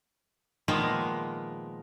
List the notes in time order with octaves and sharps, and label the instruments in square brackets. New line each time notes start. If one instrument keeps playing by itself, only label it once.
[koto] A#2 D#3 F3 G#3 A#3 B3